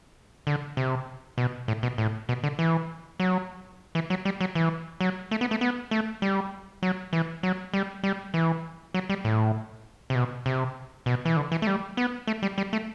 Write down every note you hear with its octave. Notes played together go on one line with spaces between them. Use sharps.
D3
C3
B2
A2
B2
A2
B2
D3
E3
F#3
E3
F#3
G3
F#3
E3
F#3
A3
B3
A3
B3
A3
G3
F#3
E3
F#3
G3
G3
E3
F#3
G3
A2
C3
B2
C3
B2
E3
D3
E3
A3
G3
B3
A3
G3
G3
A3